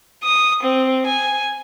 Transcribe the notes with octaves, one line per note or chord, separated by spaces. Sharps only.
D#6
C4
G#5